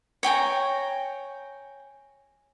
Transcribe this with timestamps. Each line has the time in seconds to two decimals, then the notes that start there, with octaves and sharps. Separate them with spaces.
0.23 C#5 G5 G#5 A#5